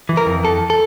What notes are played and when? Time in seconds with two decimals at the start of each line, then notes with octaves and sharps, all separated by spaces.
0.09 E3
0.17 A#4
0.26 F2
0.44 F2 A4
0.70 A4